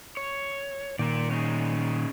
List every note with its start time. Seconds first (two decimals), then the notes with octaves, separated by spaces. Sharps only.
0.17 C#5
0.99 A#2 D#3 A#4 D5
1.31 C#4 D#4 G#4